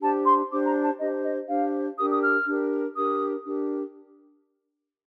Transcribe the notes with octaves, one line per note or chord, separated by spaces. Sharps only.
D4 G4 C5 A5
C6
D4 G4 C5 D6
A#5
A5
D4 G4 C5 D#5
D#5
D4 G4 C5 F5
D4 G4 A#4 D#6
D#6
F6
D4 G4 A#4
D4 G4 A#4 D#6
D4 G4 A#4